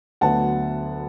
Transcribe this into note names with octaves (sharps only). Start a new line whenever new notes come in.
D2 D3 F#3 B3 F#5 A5